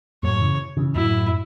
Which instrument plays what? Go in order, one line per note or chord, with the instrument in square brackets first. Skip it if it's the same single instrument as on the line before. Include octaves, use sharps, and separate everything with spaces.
[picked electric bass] F#2 A2 [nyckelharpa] C#5
[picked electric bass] C#3 E3
C#3 E3
[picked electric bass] F#2 A2 [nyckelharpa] E4